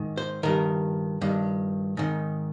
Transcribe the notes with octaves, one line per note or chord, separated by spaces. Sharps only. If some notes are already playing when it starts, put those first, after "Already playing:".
Already playing: G#2 D#3
C5
G2 D#3 A#4
G2 D#3
G#2 D#3